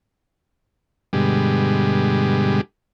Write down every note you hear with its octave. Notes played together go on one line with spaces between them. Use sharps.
G2 B2 D3 G3 G#3